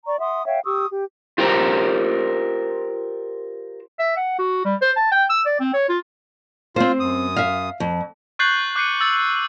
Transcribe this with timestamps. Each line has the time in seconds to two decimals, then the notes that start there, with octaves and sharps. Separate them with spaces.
0.05 D5 A#5 C#6
0.20 E5 F#5 C6 D#6
0.46 C#5 E5 F5 G5
0.65 G4 C#6 D#6 E6
0.91 G4
1.38 F4 G4 A#4 C5 A#5
3.99 E5
4.16 F#5
4.39 F#4
4.65 G3
4.82 C5
4.96 A5
5.11 G5
5.30 E6
5.46 D5
5.60 C4
5.74 C#5
5.89 F4
6.76 C4 F4 C5
7.00 F#2 D#6
7.37 E5 F5
7.80 F2
8.39 C#6 F#6 G6 A6 C7 F#7
8.75 D6 F#6 G6 C7 C#7 D#7
9.01 E6 A6